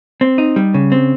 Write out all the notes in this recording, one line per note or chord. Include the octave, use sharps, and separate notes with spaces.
C4
D#4
G3
C#3
C4